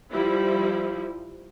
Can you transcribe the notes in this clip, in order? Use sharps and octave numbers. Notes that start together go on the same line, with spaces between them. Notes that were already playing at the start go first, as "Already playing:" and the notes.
F3 G3 E4